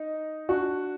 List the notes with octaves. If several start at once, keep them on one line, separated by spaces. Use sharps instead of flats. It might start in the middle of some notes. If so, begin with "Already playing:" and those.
Already playing: D#4
D4 F#4